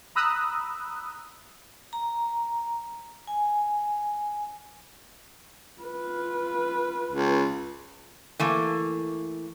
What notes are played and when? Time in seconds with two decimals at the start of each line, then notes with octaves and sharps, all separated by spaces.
0.15 A#5 B5 D#6 E6 F#6
1.93 A#5
3.27 G#5
5.80 F4 B4
7.11 C#2
8.39 E3 A3 A#3